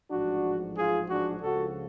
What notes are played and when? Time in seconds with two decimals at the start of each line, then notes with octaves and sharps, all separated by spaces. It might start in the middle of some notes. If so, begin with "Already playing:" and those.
0.10 A1 G#2 F3 D4 F#4
0.76 F4 G#4
1.08 D4 F#4
1.42 C#2 C#3 F3 F#4 A4